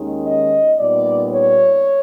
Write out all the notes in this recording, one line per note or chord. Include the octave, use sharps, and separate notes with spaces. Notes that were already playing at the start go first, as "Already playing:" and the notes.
Already playing: D#2 D#3 G#3 C#4
D#5
A#2 G3 B3 D#4 D5
C#5